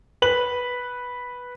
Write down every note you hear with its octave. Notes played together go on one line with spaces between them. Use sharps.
B4 F#7